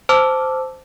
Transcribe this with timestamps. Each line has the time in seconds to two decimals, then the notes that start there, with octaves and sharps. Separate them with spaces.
0.09 C5 A5 D6 E6 F6